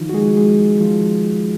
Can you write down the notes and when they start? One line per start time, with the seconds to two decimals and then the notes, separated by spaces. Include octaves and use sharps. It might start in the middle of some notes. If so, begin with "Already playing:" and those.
Already playing: D#3 F3 D#4 F4
0.09 F#4
0.13 G#3 G#4
0.37 G#3 G#4
0.81 F3 F4